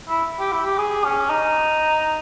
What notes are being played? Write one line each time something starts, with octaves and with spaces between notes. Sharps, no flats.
E4
G4
E4
G4
G#4
C#4
D#4